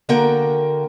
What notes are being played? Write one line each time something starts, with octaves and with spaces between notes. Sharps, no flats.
D3 A#3 F#4 A#4 F#5 G5